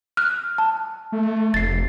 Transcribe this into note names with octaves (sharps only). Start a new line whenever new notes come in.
F6 F#6
A5
A3
F1 A6 C7